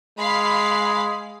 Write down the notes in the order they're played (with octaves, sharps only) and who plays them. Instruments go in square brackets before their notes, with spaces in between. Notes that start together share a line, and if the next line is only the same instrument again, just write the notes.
[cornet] G#3 [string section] F5 B5 C7